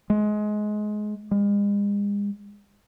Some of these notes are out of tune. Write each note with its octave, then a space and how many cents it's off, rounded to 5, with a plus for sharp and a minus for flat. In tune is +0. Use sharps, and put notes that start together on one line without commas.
G#3 +20
G#3 -40